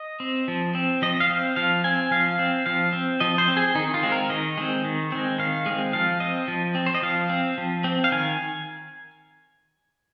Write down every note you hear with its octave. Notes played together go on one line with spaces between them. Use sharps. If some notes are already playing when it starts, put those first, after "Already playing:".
Already playing: D#5
C4
F3
C4
F3 D#5
F5
C4
F3 F5
C4 G#5
F3 F5
C4
F3 F5
C4
F3 D#5
C5
C4
G#4
D#3 D#4
F4
G#3 C4
A#4
D#3 D#5
G#3 C4
D#3
G#3 C4
D#3 F5
G#3 C4
F3 F5
C4 D#5
F3
C4
C5
D#5
F3 F5
C4
F3
C4
F5
D#3 G#5